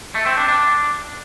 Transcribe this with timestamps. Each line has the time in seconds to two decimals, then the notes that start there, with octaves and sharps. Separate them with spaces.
0.15 A3
0.26 C4
0.37 D4
0.48 D4